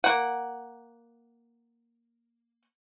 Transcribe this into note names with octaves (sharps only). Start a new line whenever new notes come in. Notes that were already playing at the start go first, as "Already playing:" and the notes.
A#3 F#5